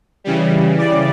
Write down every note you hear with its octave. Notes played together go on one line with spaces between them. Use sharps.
C#3 E3 G3
D5